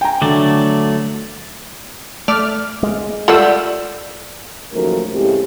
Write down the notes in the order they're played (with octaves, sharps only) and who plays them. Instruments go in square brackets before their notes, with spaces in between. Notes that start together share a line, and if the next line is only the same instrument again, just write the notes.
[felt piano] G5 G#5 A#5
[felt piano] D3 [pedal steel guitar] F#3 A3 D5
[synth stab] A3 D5 F6
[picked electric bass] G#3
[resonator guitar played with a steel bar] G3 [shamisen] A3 F#5 [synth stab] F4 E6
[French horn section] D#2 C#3 F3 F#3 A3 A#4
A2 C#3 G#3 C4 G4